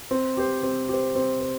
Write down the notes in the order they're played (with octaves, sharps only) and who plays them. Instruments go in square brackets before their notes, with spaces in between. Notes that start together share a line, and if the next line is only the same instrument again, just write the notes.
[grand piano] C4
G4 C5
C4
G4 C5
C4
C5